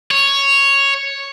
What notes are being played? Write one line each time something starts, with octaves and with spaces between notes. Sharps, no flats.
C#5